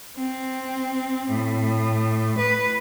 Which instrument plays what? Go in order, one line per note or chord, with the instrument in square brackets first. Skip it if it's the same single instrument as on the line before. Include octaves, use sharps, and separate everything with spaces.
[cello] C4
A2
B4